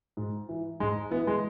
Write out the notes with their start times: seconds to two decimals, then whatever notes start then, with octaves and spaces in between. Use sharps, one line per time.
0.17 G#2
0.49 E3
0.80 G#2 G#3
1.11 E3 B3
1.27 G#3